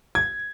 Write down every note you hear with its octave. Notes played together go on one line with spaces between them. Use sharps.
G#6